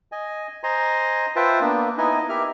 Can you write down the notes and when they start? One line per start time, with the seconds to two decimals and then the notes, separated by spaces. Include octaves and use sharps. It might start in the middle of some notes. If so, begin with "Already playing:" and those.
0.12 D#5 G#5
0.63 C5 D#5 G#5 A#5 C6
1.36 F4 B4 C5 E5 G5 A5
1.61 A#3 B3 D4
1.98 B3 D#4 E4 D#5 G#5
2.29 G4 A#4 E5 F6